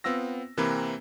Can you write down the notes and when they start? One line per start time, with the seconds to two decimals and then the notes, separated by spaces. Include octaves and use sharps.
0.04 B3 C4 F4 E6 A#6
0.57 C3 E3 A#3 C4 A#4 B4